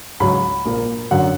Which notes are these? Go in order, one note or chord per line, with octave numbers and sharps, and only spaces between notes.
C#2 C#3 F#3 B5
A#1 A#2 A#3
F#2 D3 F#3 F#5